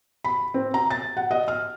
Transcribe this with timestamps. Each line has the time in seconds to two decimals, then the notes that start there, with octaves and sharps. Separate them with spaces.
0.24 B5
0.54 C4
0.74 A#5
0.90 A6
1.17 F#5
1.31 D#5
1.48 F6